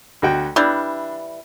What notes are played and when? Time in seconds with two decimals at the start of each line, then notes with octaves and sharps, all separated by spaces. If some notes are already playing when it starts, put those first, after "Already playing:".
0.22 D2 F#4 G5
0.56 E3 G3 D4